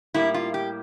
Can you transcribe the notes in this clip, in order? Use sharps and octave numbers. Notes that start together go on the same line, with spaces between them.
A2 G3 A#3 E4
F4
G4